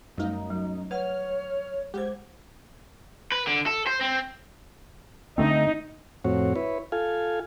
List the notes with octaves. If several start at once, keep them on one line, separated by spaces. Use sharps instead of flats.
F#2 G3 A3 D#4
F#3
B4 C#5 F#5 F6
G#3 G4 G#4 C5 G#6
B4
D3
A4
C5
C4
D3 A3 C4 D#4
F2 A2 C4 F#4 C#5
E4 B4 C#5
F4 A4 F5 G#5